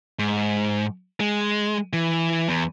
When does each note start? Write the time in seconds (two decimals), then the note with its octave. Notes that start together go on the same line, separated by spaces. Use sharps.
0.19 G#2
1.20 G#3
1.93 E3
2.49 E2